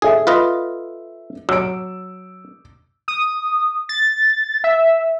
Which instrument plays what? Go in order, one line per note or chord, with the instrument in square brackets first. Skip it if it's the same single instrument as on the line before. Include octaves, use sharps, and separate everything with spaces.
[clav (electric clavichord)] G#4 [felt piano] A4 E5
[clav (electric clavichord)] F4 B4 D#5
[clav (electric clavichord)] F#3 [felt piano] E6 D7
[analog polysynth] D#6
A6
E5